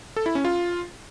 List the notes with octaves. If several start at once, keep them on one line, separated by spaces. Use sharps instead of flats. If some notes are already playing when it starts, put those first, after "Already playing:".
A4
E4
C#4
F4